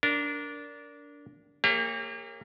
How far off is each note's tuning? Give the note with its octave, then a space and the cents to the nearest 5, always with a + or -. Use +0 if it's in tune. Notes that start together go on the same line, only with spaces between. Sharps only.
D4 -20 A#4 +0
A#3 -20 G4 +45 C#5 -20